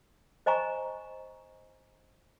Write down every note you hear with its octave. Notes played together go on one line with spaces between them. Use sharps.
C5 D#5 G#5 A#5 C#6